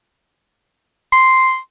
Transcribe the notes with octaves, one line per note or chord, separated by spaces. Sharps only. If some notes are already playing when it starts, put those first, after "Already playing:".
C6